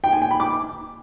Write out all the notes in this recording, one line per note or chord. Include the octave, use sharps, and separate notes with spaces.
G5
G#5
G5
B5
D6